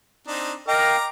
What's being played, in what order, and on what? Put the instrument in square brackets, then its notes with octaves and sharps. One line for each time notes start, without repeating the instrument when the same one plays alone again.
[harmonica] C4 D4 D#4
[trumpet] A#4 [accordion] D#5 F5 G5 [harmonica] A#5 D6